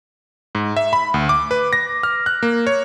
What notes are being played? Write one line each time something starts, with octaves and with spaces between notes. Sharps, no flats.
G#2
E5
B5
D2
D6
B4
A#6
F6
F#6
A#3
C#5